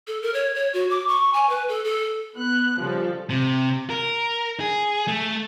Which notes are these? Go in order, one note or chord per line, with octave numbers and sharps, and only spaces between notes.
A4
A#4
C#5
C#5
F#4
D6
C#6
G#5
B4
A4
A4
B3 F#6
C#3 F3 G3 A4
C3
A#4
G#4
A3